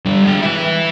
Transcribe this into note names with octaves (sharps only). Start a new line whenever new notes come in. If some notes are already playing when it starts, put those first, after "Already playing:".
D3 G3
G#3 G5
E4 B4